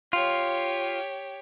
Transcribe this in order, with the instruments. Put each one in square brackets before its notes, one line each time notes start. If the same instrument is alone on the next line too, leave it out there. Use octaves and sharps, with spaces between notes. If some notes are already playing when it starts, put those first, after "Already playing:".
[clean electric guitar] F4 [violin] G4 C#5